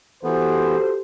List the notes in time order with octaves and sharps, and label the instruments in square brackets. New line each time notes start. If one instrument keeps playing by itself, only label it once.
[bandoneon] E3 B3 [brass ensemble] F#4 G4 C5 [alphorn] A4